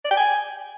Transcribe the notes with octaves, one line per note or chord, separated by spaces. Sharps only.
D5
G5
G#5